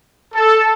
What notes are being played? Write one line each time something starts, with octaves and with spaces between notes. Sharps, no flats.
A4